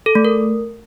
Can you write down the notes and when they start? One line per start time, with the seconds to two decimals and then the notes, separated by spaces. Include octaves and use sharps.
0.06 A4
0.15 A3
0.25 A#4